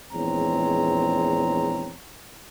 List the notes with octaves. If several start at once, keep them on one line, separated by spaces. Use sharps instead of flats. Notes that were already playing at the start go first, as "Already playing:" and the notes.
A#1 E2 G#3 C4 C#5 A#5